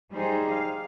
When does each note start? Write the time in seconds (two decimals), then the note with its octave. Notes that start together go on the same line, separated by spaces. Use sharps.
0.12 G3 D#4 G#4 C5
0.51 F5